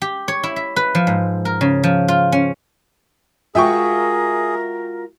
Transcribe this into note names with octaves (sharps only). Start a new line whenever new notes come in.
G4
C#5
E4
E5
B4
F3
G#2
A#4
C#3
F3
F4
C#4
G#3 F4 F#4 G#4 A#4 E5 G5 C#6